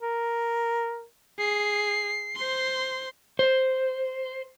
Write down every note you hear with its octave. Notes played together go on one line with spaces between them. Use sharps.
A#4
G#4 C7
C5 C6
C5